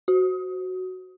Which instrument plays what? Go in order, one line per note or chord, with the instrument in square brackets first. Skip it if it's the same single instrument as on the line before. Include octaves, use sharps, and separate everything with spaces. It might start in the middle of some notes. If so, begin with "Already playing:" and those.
[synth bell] F#4